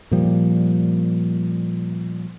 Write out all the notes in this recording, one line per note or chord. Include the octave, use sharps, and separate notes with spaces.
A#2 F3 G3